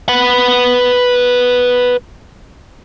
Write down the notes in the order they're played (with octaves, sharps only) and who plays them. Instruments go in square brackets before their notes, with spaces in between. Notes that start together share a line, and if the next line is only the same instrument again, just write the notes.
[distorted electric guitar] B4 F#5